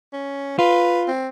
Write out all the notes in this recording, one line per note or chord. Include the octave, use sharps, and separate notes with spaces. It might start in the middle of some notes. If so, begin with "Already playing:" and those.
C#4
F4 B4
C4